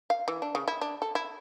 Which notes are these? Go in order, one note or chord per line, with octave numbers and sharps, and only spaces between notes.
F5
E3
D4
C#3
E4
D4
A4
E4